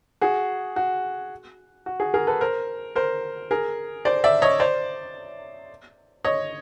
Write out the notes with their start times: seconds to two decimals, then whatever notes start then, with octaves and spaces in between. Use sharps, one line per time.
0.21 F#4 G#4
0.76 F#4
1.86 F#4
2.00 F#4 G#4
2.14 G#4 A#4
2.27 A4 B4
2.41 A#4 C5
2.96 A#4 C5
3.51 G#4 A#4
4.05 C5 D5
4.24 D5 E5
4.42 C#5 D#5
4.60 C5 D5
6.25 C#5 D#5